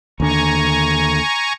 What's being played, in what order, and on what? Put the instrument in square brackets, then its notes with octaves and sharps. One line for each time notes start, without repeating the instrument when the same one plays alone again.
[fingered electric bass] D#2 D3 [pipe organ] G#5 A#5 C#6